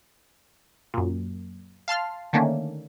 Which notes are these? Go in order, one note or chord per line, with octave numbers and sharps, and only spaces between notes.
F#2 A#2
F5 A5 C6 F6
D3 D#3 A3 A#3 C#4 D4